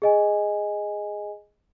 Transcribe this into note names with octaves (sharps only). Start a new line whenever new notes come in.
G#4 D#5 G#5